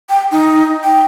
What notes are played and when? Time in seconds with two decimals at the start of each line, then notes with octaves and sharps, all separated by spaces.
0.10 G5
0.31 D#4
0.84 G5